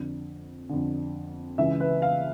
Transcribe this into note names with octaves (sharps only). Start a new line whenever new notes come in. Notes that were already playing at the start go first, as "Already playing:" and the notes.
Already playing: F2 D3
F2 D3
C#2 C#3 E3 E5
B4
F5